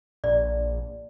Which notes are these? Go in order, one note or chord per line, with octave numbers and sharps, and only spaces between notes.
A#1 D5